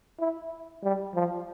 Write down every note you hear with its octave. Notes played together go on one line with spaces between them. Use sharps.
E4
G3
F3